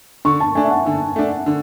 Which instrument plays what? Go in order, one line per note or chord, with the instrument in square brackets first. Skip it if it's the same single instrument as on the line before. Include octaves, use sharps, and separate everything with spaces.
[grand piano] D3 [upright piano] C#6
[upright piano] A5
[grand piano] A3 D4 [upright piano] G#5
[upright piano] E5
F#5
[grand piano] D3 [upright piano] G#5
[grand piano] A3 D4
D3